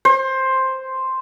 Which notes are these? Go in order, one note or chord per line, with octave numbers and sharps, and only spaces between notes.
C5